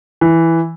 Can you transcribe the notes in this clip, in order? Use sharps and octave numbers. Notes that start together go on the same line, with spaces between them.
E3